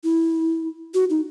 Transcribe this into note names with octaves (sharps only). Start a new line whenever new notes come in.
E4
F#4
D#4